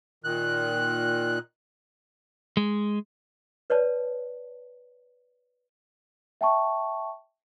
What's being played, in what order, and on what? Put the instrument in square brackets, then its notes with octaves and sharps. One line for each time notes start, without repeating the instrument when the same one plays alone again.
[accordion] A#2 D#3 F#6
[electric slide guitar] G#3
[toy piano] B4 C#5 D5 A5
[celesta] E5 G5 A5 C#6